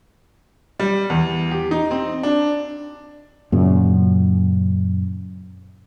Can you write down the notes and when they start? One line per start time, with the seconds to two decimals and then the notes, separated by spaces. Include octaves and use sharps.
0.80 G3
1.10 E2
1.51 G4
1.71 D#4
1.91 C4
2.23 D4
3.52 F#2 A#2 C#3